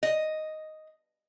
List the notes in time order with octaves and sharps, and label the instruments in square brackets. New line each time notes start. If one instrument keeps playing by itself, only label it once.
[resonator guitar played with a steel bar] D#5